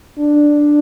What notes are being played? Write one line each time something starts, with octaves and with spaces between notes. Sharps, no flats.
D4